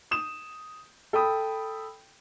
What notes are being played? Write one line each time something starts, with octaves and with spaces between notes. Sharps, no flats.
D#6 E7
A4 G5 B5 D#6